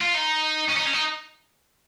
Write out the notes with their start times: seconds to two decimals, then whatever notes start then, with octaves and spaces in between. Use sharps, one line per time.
0.01 F4
0.15 D#4
0.68 C#4
0.77 D#4
0.85 C#4
0.93 D#4